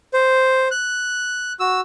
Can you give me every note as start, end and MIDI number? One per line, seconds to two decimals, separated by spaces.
0.14 0.68 72
0.71 1.53 90
1.60 1.81 66
1.60 1.81 88